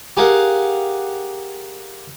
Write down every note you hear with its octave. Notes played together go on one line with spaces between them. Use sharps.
G4 G#4 A#4 F5 F#5